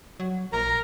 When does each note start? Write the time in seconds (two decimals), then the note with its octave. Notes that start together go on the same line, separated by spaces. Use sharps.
0.20 F#3
0.53 A#1 A#4 A#5